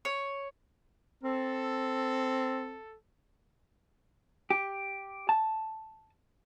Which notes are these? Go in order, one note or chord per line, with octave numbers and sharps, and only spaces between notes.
C#5
C4 A4
G4
A5